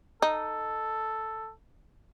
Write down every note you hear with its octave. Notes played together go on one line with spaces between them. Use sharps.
D#4 A4